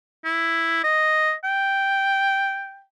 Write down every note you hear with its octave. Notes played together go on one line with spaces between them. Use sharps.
E4
D#5
G5